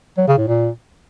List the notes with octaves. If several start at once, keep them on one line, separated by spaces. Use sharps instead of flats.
F#3
C#3
A2
A#2